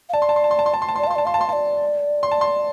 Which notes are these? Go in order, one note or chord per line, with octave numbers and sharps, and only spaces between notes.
F5
D5 A5
C6
A5
C6
A5
C6
A5
C6
A5
C6
A5
D5 C6
A5
F5 C6
D5
A5
F5 C6
A5
C6
D5 F5 A5
C6
A5
C6